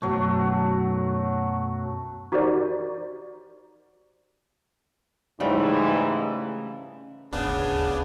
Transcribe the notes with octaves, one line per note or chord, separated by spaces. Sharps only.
B1 F#2 F#3 A3
D#4 F#4 G4 A#4 C5 D5
G#2 C#3 E3 G3 A3
D#1 G#1 D2 C#3 B3 D4